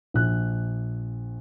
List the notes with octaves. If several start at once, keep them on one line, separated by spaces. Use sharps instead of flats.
A#1 F#6